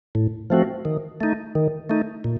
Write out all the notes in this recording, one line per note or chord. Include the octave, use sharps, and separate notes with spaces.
A2
F3 A3 C4 F#4
D#3
A3 D#4
D#3
A3 D#4
A#2